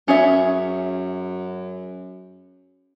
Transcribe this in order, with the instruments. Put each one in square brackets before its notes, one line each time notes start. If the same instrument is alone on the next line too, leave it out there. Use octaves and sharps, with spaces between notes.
[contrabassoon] F#2 [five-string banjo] C#4 G#4 E5